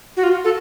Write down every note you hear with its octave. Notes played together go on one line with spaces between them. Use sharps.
F#4
F4
A4